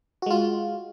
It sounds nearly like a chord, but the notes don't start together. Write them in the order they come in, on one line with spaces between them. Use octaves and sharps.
F#4 G#3 F4